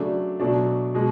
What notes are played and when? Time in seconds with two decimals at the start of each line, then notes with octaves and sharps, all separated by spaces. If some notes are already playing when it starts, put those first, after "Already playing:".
Already playing: C#3 F#3 A3 D4
0.40 B2 F#3 A3 D4
0.95 B2 G#3